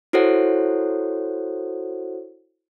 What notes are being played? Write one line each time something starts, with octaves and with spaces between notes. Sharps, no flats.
E4 F#4 A4 C5 C#5 F#5